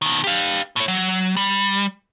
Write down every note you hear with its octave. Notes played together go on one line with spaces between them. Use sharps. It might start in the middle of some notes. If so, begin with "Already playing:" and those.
B2 D#3
G4 F5
A2 C#5
F#3
G3